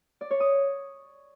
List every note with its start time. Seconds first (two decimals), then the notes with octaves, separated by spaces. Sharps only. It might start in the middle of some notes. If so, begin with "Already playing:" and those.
0.21 D5
0.31 C#5
0.40 D#6